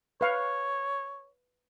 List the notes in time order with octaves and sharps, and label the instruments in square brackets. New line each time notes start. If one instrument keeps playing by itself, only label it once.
[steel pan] B4 F5 C#6 [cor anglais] C#5